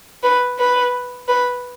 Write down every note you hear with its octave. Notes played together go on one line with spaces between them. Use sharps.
B4
B4
B4